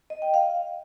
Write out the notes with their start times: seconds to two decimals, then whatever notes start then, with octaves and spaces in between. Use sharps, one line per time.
0.10 D#5
0.22 G5
0.34 F5